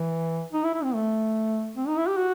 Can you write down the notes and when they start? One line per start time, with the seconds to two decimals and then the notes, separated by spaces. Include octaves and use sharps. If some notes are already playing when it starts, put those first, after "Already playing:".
Already playing: E3
0.53 D#4
0.64 E4
0.74 E4
0.84 C4
0.94 A3
1.77 C4
1.88 D#4
1.97 E4
2.07 G4
2.17 F#4